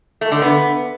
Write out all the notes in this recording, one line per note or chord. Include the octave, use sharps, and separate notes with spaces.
A3
D3
B3